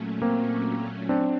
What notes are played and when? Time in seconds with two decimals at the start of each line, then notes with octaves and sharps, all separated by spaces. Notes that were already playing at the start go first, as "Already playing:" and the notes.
Already playing: A#2 F#3 A3 C#4
0.22 A#3 C4
1.09 F#3 C4 D4